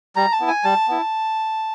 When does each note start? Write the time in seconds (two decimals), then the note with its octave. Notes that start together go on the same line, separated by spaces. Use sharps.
0.16 G3 A#5
0.32 A5
0.40 B3 E4
0.48 G#5
0.64 G3 A5
0.88 B3 E4